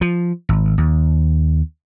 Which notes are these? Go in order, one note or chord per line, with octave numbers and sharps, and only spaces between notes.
F3
G#1
D#2